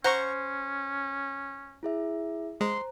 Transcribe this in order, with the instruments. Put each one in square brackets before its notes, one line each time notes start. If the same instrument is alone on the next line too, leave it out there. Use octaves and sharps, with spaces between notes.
[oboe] C#4 [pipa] C5 [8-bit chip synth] F#5 A#5 C#6
[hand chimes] E4 G#4 E5
[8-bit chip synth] G#3 [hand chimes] C5 A#5 [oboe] C6